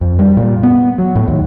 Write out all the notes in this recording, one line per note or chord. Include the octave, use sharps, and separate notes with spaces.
F2
G3
A#2
B3
F#3
A2
D#2